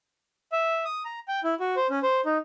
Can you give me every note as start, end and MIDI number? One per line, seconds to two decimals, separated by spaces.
0.52 0.84 76
0.85 1.03 87
1.05 1.19 82
1.28 1.40 79
1.44 1.54 64
1.60 1.75 66
1.76 1.87 72
1.90 2.00 61
2.03 2.21 72
2.25 2.38 63